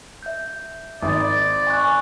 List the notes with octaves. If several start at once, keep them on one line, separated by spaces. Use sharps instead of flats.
E5 G6
G#1 D5 D#6
G#5 C#6 F#6